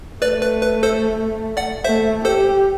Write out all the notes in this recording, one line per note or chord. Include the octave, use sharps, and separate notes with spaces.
A3 B4 D5
B4
B4
A4 C5
D5 F#5
A3 C5 E5
G4 A4 C5